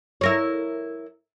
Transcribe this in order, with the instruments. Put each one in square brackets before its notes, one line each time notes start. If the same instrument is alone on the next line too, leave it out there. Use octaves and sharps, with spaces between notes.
[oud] E4 A#4 C#5